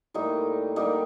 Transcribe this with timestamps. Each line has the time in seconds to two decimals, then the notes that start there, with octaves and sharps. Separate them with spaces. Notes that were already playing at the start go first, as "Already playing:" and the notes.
0.14 A2 G3 A#3 D#4 G4
0.76 D3 G3 A#3 D#4 G4